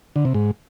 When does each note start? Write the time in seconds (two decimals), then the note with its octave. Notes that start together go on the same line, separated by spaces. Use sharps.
0.16 D3
0.25 C3
0.34 G#2